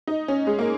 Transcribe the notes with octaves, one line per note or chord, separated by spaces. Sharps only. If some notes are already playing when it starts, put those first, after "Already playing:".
D#4
C#4
G#3
A#3